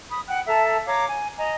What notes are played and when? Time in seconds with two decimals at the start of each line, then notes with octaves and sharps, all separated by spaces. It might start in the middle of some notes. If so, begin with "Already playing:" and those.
0.09 B5 D#6
0.28 F#5 G5 F#6
0.47 A4 E5 A5 A#5
0.86 C#5 F5 A#5 D6
1.08 G#5
1.37 D#5 G#5 A#5